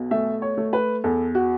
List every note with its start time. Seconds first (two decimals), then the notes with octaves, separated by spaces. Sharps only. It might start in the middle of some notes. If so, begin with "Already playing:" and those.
Already playing: B1 B2
0.11 A3 E5
0.42 C#5
0.58 A3
0.73 B4
1.04 E2 A4
1.35 F#4